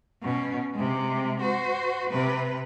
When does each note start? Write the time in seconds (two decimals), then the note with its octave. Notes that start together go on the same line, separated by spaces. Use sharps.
0.22 B2 C#4
0.73 C3 G#3
1.41 F#4 C5
2.10 C3 B4